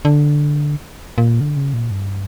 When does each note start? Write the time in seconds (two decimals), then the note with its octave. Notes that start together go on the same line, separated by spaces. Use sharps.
0.05 D3
1.18 A#2
1.41 D3
1.57 C#3
1.73 A#2
1.91 G2